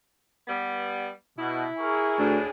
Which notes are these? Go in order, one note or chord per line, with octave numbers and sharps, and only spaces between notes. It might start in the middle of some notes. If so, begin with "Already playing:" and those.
G3 B3
B2 E4
G#4 A#4 C#6
D2 A2 D4